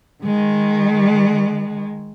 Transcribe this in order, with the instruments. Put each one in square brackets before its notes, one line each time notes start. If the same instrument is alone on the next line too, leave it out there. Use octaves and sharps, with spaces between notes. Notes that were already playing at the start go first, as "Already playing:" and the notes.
[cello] D#3 G#3